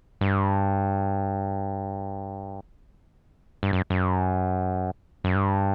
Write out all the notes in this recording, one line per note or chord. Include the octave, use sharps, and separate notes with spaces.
G2
G2
F#2
F#2
F#2
G2